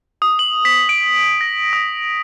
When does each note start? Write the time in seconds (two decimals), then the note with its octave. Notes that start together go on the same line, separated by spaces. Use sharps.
0.22 D#6
0.39 F#7
0.65 B6
0.89 D7
1.41 A#6
1.73 D#6